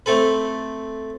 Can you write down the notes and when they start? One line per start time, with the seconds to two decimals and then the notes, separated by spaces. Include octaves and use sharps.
0.06 A3 C4 A4 B4